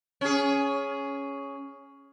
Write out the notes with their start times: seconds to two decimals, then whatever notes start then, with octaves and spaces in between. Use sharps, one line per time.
0.21 C#4 G#4